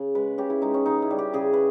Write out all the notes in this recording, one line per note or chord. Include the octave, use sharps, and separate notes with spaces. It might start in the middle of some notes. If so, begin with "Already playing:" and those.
Already playing: C#3
G#3 B4
C#3 G4
E4
G#3 D#4
C#4
C#3 D#4
E4
G3
G4
C#3 G#4
B4